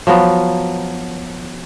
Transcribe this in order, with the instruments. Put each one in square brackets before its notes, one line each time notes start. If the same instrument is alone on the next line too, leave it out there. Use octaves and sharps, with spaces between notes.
[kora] F3 F#3 B3